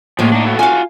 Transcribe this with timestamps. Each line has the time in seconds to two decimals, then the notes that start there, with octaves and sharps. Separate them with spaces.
0.19 A2 F3 G#3 A#3 F4
0.32 D4 D#4
0.45 E4 F#4 A4
0.59 F4 F#4 F5 G#5